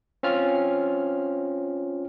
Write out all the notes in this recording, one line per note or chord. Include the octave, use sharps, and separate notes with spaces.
C4 C#4 F4 F6